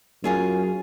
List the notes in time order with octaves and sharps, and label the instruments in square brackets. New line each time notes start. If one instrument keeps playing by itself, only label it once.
[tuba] F#2 [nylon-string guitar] F4 G#4 C#5